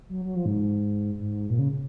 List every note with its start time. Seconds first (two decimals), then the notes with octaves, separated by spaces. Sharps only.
0.09 F#3
0.25 F#3
0.36 F3
0.46 G#2
1.18 G#2
1.50 A#2
1.59 C#3